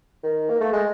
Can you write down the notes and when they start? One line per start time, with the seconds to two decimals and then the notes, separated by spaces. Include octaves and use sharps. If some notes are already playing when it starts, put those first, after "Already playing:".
0.23 D#3
0.50 A#3
0.61 A3
0.72 G#3